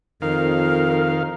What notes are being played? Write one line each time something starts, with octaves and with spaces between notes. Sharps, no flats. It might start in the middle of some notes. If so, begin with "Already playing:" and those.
F2 D#3 A#4 F5